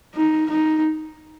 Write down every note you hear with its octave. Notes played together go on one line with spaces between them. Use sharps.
D#4
D#4